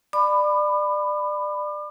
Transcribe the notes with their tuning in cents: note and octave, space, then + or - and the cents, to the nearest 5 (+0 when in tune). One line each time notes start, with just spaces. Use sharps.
D5 +20 B5 +15 D6 +40